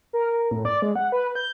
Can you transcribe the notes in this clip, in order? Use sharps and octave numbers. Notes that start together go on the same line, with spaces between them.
A#4
A2
D5
G#3
F#5
B4
G6